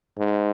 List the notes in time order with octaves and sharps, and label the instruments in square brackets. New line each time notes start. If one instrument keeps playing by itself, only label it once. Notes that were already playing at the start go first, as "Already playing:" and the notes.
[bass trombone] G#2